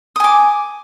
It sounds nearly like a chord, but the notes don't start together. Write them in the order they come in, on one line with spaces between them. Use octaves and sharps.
D#6 G#5 D6